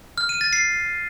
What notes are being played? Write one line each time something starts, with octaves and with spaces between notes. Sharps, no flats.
F6
D#7
A6
C7